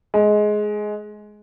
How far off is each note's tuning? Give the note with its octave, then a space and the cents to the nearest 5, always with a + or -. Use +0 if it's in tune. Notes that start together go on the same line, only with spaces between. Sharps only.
G#3 +15